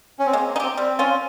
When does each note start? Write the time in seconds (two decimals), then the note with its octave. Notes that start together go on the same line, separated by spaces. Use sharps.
0.19 C#4
0.26 C4
0.33 G#3 A#3
0.49 A#3
0.56 D#4
0.60 C4 G4
0.77 G3 C4
0.99 C#4 F4